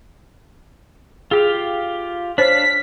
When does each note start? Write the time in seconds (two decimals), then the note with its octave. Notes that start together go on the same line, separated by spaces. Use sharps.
1.31 F4 G4 G#4 F5
2.38 D4 C5 C#5 F5 B6